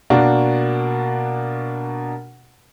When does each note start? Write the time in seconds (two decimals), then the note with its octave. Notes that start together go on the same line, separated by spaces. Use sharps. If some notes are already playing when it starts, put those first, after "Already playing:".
0.10 B2 A#3 D4 F#4